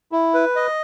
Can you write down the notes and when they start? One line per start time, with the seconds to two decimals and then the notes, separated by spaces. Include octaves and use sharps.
0.12 E4
0.34 B4
0.56 D#5